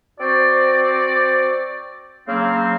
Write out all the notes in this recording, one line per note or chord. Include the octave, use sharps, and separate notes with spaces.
C4 F#4 C5 D5
C#3 F#3 A#3 C4 F5